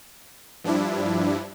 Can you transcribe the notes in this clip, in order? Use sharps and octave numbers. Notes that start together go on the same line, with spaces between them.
G2 F3 G3 D4 E4